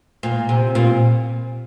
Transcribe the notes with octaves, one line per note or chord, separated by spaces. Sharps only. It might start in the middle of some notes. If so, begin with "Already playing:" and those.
A#2
C3
A#2